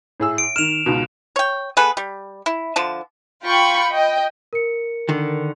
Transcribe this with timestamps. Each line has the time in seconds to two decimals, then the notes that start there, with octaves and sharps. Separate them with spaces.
0.20 A2 G#4 E6
0.38 D7
0.56 D#3 F6 E7 F7
0.86 C#2 G#2 B2
1.36 C#5 G5
1.77 B3 G#4 A4 B4
1.97 G3
2.46 E4
2.76 D3 F3 A5
3.44 F4 G5 B5 C#6
3.90 D#5 G5
4.53 A#4 C#7
5.09 D3 D#3